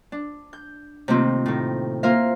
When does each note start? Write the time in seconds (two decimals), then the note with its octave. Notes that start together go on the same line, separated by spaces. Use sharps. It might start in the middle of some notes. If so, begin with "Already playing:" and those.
0.12 D4
0.53 G6
1.08 C3 D#3 A3 A#3 C4 F4
1.46 A2 D#3
2.03 A#3 F4 A#4 C5 E5 F5